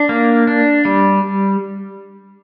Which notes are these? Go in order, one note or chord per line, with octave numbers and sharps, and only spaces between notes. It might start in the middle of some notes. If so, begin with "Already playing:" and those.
Already playing: D4
A#3
D4
G3